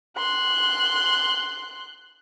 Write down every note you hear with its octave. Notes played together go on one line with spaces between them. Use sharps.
C6 F#6